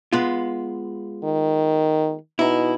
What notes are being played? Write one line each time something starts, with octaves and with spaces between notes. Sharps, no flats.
G#3 B3 F4
D#3
B2 D#4 E4